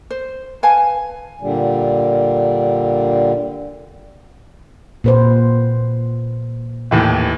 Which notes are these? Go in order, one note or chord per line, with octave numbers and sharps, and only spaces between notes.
C5
B4 F5 G#5 A5
A#2 D3 G3
A#2 B4 C5
D#2 A2 E3